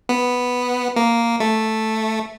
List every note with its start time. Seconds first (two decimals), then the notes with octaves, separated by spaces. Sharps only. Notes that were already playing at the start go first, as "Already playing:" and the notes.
0.09 B3
0.96 A#3
1.40 A3